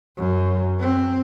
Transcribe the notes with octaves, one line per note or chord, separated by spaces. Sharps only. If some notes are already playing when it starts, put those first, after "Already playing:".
F#2
C4